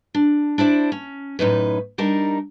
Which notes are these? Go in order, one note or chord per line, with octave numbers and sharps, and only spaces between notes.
D4
D4 E4 C5 D5
C#4
F#2 A2 D#4 B4
G3 D4 D#4 A#4